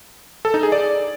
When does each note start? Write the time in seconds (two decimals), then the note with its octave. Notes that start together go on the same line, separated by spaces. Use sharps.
0.45 A4
0.54 D#4
0.63 G#4
0.72 D5